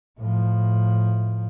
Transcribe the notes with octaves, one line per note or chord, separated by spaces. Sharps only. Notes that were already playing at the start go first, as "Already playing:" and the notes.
A2 F3